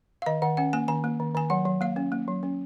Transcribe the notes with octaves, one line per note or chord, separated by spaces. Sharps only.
F5
D#3 D#5
D#3 F#5
C#4 F#5
A#3 G#5
D#3 G#5
A#3
D#3
D#3 G#5
F#3 F#5
F#3
A#3 F5
C#4
A#3
F#3
C#4